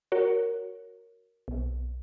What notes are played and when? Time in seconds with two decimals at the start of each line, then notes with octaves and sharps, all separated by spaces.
0.12 F#4 A#4 C#5
1.48 B1